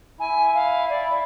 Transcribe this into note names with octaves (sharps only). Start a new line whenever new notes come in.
E4 G#5
F5
D5